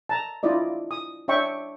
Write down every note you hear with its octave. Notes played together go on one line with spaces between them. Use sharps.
A5 A#5
D4 E4 F4 D5 D#5
D#6
D4 C#5 E5 G5 C#6